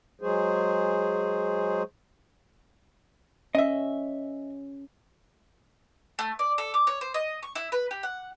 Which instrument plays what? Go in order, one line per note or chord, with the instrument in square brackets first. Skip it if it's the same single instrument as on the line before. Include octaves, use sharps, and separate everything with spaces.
[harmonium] F#3 G#3 G#4 C5
[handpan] C#4 [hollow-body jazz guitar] D#5 E5
[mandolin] A3
D5
A4
D6
C#5
C5
D#5
C#6
E4
B4
G4
F#5